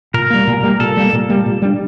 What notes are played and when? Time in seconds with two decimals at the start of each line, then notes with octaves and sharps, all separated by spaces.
0.14 A#2 A#4
0.30 G3 A#3
0.47 A#2
0.63 G3 A#3
0.80 A#2 A4
0.97 G3 A#3
1.13 A#2
1.29 G3 A#3
1.46 A#2
1.62 G3 D4